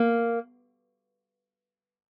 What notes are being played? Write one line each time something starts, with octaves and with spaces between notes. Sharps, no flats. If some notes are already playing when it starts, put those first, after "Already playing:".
Already playing: A#3